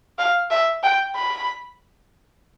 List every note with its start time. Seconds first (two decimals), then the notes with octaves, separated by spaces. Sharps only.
0.19 F5
0.51 E5
0.83 G5
1.16 B5